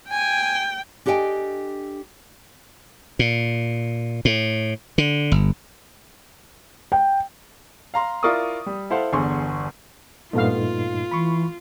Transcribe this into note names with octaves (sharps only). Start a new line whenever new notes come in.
G5 G#5
D4 G4 A4 D#5 G5 G#5
A#2
A2
D3
G1
G5
F5 A#5 C6
E4 F4 A#4 D5 C#6 D#6
G3
E4 A4 C5 F5 F#5
G1 E2 D3 G#4 C6 C#6
G2 A#2 A3 B3 D#4 F4 F5
E3 B5 C#6